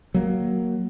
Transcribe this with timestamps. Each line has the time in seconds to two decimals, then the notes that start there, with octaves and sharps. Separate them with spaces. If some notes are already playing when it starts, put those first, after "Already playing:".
0.14 F#3 A#3